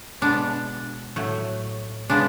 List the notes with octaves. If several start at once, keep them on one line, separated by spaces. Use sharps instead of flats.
B2 G#3 B3 D4
A2 F#3 A3
C#3 G#3 B3 D4